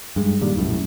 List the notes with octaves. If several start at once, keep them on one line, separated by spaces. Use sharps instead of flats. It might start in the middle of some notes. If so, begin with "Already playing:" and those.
G2 G#3
A#2 D#3 G3
B1 F#2 A2